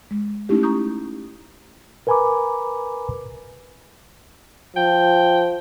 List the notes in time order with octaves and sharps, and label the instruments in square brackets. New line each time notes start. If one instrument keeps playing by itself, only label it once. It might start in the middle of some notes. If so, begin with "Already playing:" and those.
[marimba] G#3
A3 C#4 D#4 E4 G4
A#5 C#6 D#6 G6
[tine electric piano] A#4 B4 G#5 A#5 B5 D6
[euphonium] F3 [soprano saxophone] G5